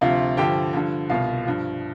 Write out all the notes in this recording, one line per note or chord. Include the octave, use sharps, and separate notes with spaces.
D2 C3 F3 F4 F5
G2 D3 F3 G4 G5
G2 D3 F3
C2 B2 F4 F5
G2 F3